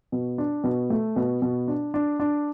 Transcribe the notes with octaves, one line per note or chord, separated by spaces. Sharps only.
B2
D4
B2
A3
B2
B2
D4
D4
D4